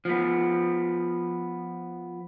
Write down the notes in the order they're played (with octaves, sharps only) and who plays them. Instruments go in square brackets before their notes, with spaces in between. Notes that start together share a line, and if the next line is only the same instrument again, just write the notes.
[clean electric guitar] F3 B3